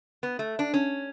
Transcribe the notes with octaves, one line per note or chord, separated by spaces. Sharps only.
B3
A3
D4
C#4